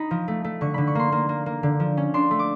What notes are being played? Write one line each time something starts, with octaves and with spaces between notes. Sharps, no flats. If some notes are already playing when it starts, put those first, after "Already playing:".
Already playing: D#4 B5
F3
A3
A3
D3 C#6
D3 B5
C#6
A#3 C6
A#3
A#3
A#3
D3
F3
C#4
D4 C6
A3
D6